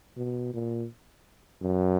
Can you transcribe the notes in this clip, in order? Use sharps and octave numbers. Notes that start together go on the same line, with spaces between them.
B2
A#2
F#2